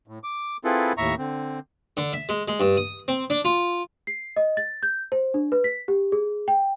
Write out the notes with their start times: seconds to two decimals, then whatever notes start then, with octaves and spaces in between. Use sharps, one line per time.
0.07 A2
0.24 D6
0.65 C4 E4 F4 G#4 A4 B4
0.98 D#2 A2 E5 A#5 C#6
1.19 D3 C4
1.97 D3
2.13 E5
2.29 G#3
2.48 G#3
2.60 G2
2.77 D#6
3.08 C4
3.30 D4
3.45 F4
4.07 C7
4.36 D#5
4.57 A6
4.83 G6
5.12 C5
5.34 D4
5.52 B4
5.64 B6
5.88 G4
6.12 G#4
6.48 G5